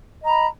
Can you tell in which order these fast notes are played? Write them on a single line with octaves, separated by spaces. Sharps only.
D#5 A#5 B5